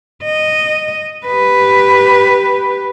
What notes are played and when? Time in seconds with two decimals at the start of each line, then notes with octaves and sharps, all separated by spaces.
0.24 D#5
1.26 G4 B4